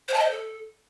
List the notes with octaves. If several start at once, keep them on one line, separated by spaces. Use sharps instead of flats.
C5
A5
D#5
C5
A4